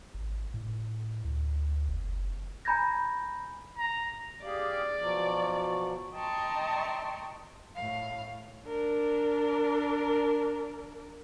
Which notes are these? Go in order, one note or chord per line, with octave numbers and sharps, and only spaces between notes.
G#1
A2
D2
F#1
G#5 A#5 B5 G6 G#6 A#6
A#5
G4 G#4 D5 F5
B2 F3 F#3
D#5 G5 A5 A#5 C6 C#6
A2 F5
D4 A#4